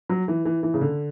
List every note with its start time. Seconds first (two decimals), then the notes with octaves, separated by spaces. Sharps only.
0.09 F#3
0.28 E3
0.45 E3
0.63 E3
0.74 C#3
0.81 D3